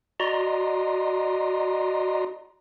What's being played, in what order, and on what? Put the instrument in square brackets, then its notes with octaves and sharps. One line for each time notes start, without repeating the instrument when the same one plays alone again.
[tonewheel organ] F#4 D5 D#5 A#5 C6